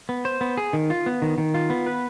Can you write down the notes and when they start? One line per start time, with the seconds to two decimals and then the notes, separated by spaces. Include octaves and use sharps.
0.09 B3
0.25 C5
0.41 B3
0.57 G#4
0.73 D#3
0.90 F4
1.06 B3
1.22 D#3
1.38 D#3
1.54 F4
1.70 B3
1.87 B4